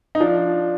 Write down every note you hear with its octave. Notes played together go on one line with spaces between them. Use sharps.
D#4
F3 D4